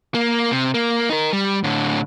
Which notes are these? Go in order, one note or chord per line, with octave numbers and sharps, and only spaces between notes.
A#3
C3
A#3
D#4 A#4
G3
A2 D3